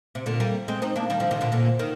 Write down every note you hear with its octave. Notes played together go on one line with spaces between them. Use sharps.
C3
A#2 D3
G3 A#3
G#3 C4
C4 D#4
A#3 D4
D#3 G3
D3 F3
C3 D#3
A#2 D3
A#2 D3
D#3